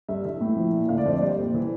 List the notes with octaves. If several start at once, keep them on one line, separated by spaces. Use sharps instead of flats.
G2 E5
E3 E5
A2
F3
A#2
D3 F5
D5
F2 C5
D5
G3 C5
A#2
E3